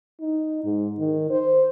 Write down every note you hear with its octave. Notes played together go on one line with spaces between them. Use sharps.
D#4
G#2
D#3
C5